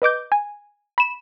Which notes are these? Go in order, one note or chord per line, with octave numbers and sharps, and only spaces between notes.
B4 D#5 D6 G6
G#5
B5 E7